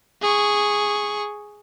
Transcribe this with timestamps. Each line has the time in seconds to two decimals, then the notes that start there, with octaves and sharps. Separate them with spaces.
0.22 G#4 C#6